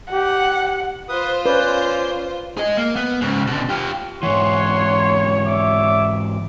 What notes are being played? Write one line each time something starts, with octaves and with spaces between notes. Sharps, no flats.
G4 F#5
F4 B4 C5 D#6
C#4 B4 D5 G6
G#4 D#5
A#3
B3
G#2 C#3
B2 D3
F4 G4
G#2 E3 C#5 F#5 C6
D5 E5 D6